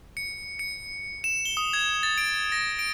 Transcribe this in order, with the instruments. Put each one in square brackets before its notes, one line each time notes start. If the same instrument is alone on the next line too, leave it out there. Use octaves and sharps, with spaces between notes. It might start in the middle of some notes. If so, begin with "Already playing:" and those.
[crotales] C#7
C#7
E7
G7
D#6
G#6
A6
D7
A#6
D7